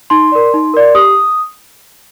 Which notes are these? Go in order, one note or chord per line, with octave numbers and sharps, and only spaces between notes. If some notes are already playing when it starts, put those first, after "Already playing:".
D#4 C6
A#4 D5
D#4
A#4 D5
G4 D#6